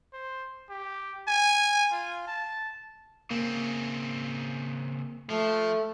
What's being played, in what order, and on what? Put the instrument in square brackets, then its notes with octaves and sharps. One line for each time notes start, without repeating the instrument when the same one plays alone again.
[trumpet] C5
G4
G#5
F4
A5
[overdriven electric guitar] C#3 C4 [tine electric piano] A#3
[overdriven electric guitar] F3 [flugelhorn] A3